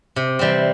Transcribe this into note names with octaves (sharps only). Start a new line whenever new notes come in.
C3
E3 G3 C4